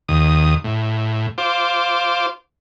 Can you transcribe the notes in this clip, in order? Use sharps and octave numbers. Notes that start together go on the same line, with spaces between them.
D#2 D#6
A2
F4 C5 D6